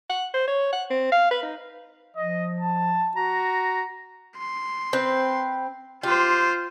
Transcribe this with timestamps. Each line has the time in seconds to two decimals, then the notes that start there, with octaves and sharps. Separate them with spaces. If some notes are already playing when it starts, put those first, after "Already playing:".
0.10 F#5
0.34 C5
0.48 C#5
0.73 F#5
0.90 C4
1.12 F5
1.31 B4
1.43 D#4
2.16 F3 D#5
2.61 A5
3.16 F#4 A#5
4.38 C6
4.93 C4 B4
6.03 F4 G4 C5